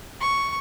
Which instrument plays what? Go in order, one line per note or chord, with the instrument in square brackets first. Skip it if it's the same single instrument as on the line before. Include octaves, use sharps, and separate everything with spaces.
[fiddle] C#6